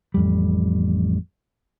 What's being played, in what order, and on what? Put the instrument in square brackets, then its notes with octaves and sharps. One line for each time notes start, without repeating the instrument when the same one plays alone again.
[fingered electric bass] A1 F2 G3